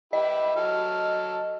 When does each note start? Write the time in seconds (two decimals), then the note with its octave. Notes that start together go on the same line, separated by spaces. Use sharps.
0.13 E4 G4 B4 D#5
0.56 F#3 A4 F6